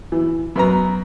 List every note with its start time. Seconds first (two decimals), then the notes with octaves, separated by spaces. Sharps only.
0.12 E3
0.56 F#2 B3 A#5